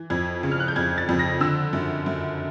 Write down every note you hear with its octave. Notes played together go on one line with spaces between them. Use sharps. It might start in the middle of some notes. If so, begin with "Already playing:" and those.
Already playing: E3
F2 G#6
C#3
F6
F#6
G6
F2 G#6
A6
F2
A#6
D3 E6
F#2
F#2